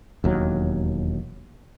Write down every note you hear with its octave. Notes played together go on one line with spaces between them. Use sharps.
E1 D#2 F#3